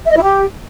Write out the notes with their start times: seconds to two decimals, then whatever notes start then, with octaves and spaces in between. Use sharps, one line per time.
0.06 E5
0.11 D#5
0.17 E4
0.22 G4